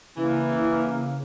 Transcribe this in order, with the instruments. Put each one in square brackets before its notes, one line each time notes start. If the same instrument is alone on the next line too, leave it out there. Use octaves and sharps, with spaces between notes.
[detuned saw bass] C#3 [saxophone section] E3 [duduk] A#3 [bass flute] E4